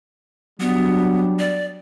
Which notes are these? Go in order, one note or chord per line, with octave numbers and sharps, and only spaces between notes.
F#3 G3 B3 D4
D5